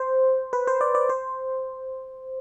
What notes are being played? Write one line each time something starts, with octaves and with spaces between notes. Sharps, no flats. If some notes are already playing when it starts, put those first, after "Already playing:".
Already playing: C5
B4
C5
D5
D5
C5